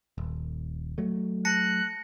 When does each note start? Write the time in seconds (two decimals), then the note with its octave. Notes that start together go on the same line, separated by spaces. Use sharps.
0.18 D#1
0.98 F#3 A3
1.45 A5 F#6 A#6 C#7